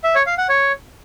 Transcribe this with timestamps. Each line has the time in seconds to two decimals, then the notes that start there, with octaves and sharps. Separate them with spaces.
0.04 E5
0.15 C#5
0.26 F5
0.38 F#5
0.49 C#5